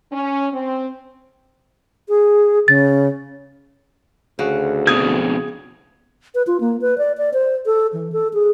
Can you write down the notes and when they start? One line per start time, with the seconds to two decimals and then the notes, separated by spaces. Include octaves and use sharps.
0.11 C#4
0.52 C4
2.09 G#4
2.68 C#3 A6
4.39 D2 C#3 F#4
4.87 F2 B2 D#6 G#6
6.35 B4
6.47 F4
6.60 A#3
6.81 B4
6.98 D5
7.18 D5
7.33 C5
7.66 A4
7.93 E3
8.12 A4
8.34 G#4